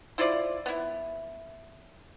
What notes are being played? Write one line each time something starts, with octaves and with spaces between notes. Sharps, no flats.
E4 F4 C5 D5
B3 E4